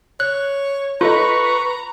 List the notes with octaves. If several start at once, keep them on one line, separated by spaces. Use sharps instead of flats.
C#5 F#6
F4 A4 B4 D#5 A#5 C#6